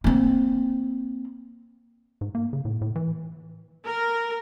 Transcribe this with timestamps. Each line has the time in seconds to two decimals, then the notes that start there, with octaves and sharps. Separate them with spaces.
0.04 A#3 C4
2.21 G#2
2.35 A#3
2.53 C#3
2.65 A2
2.81 A2
2.96 E3
3.85 A#4